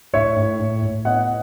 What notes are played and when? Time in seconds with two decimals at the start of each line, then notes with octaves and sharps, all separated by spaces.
0.13 A2 C#5 E5
0.36 A2
0.59 A2
0.82 A2
1.05 B3 D#5 F#5